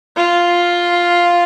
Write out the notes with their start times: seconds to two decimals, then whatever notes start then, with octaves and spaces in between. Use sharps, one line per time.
0.17 F4